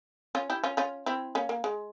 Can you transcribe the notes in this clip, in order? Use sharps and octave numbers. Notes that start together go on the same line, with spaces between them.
C#4 F4
E4 G4
C#4 F4
C#4 F4
C4 E4
A#3 C#4
A#3
G#3